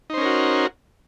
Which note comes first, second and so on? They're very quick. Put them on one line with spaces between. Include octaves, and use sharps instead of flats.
D#4 C5 C#4 A#4 F#4